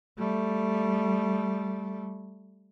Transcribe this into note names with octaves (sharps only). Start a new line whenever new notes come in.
G3 A3